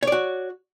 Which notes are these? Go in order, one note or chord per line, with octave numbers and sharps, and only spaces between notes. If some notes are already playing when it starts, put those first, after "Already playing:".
F#4 C#5 D5